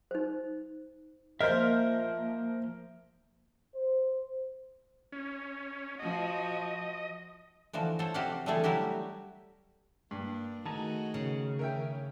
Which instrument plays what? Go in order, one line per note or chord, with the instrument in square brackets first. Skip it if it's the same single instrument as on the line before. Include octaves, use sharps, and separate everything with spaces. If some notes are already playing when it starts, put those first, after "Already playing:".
[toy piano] D#4 C5
[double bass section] F3 A#3 [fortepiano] A#4 C5 [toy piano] D#5 [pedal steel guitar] E5 F6 G6
[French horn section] C5
[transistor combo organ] C#4
[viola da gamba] F3 F#4 [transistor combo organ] D#5
[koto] D3 E3 F3 F#4
A4 C5 C#5
C3 F#4 G4 A4 F5 F#5
D3 E3 G3 A3 G#4 A4
F#3 G3 E4 F#4 G4
[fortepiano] G2 [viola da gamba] A#3 D4
[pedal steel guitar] D#3 G#4 A#5 [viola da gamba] A3 F#4 D#5 [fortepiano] A5
[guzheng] C#3
[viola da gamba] C#4 [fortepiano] A#4 E5 G5